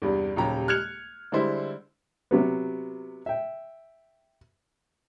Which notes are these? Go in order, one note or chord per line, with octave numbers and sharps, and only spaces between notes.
E2 G2 C3 D4
D#1 D#2 C#3 F#3 G4 A#5
F6 F#6 G#6 C#7 F7
D3 G3 G#3 E4 C5
C3 F#3 B3
E5 G5